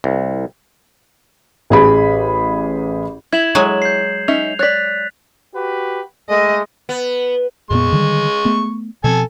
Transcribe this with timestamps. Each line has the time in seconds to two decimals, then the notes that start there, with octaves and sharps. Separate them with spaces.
0.04 C2
1.70 A1 G#4 B5
3.33 E4 G#6 E7 F#7
3.55 F#3 G#3 G#5
3.82 G6 C7
4.28 C#4 D#4 E5 F7
4.59 C#5 D5 F#6 A6 B6
5.54 F#4 G4 B4
6.29 G#3 A3 D#5
6.89 B3
7.70 F2 A#2 G#3 B3 C#6
7.92 D3 D#3 G3
8.45 A3 B3
9.04 B2 F3 C4 A4 G#5